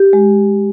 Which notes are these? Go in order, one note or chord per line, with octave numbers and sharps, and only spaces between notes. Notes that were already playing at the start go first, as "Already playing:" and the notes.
Already playing: G4
G#3